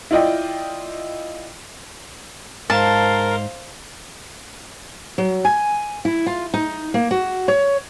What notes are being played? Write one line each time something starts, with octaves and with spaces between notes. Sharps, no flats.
E4 F4 D5 D#5 G5
G#2 A#4 C5 F5 A5
F#3
G#5
E4
F4
D#4
A#3
F#4
C#5